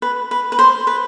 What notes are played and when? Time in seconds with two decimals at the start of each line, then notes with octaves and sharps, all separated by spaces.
0.02 B4
0.31 B4
0.52 B4
0.59 C5
0.87 B4